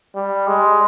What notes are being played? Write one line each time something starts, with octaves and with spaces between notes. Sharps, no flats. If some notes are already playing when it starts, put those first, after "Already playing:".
G3
G#3